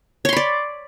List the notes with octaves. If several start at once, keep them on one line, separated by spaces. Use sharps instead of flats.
C#5 D5 B5 C6